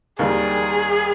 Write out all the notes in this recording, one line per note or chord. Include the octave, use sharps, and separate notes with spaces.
D#2 D#3 G3 G#4